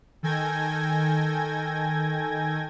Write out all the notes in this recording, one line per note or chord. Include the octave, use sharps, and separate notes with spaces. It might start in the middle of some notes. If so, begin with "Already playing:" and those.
D#3 A4 G5 G#5 G#6 A#6